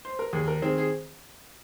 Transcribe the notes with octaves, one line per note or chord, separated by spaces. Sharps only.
C5
A#4
D#2 G#4
A#4
D#3 C4 G#4
G#4